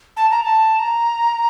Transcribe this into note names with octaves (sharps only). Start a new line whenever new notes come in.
A5
A#5
A5
A#5